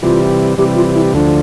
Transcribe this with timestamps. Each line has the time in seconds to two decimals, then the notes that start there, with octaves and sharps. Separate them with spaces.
0.02 C3 E3 G3 F4
0.58 C3 E3 G3 G4
0.76 F4
0.95 E4
1.13 D2 D3 F3 D4